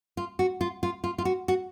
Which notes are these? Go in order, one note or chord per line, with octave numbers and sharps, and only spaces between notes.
F4
F#4
F4
F4
F4
F4
F#4
F#4